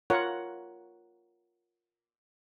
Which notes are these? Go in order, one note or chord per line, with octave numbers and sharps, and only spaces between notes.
F4 A#4 C#5 F#5